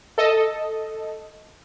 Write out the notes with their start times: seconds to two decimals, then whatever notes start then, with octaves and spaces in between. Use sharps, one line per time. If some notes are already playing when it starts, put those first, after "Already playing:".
0.18 A4 D#5